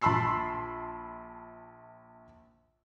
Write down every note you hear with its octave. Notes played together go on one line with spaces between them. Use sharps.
A#1 A5 B5 C6 E6 C7